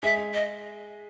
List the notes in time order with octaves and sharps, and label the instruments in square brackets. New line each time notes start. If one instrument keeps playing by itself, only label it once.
[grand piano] G#3 G#4 [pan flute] E5
[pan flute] D#5